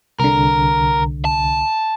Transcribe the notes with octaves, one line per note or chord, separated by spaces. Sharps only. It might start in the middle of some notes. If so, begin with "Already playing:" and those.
C2 D3 A#4
A5